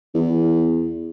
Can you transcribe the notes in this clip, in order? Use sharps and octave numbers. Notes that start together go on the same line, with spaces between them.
E2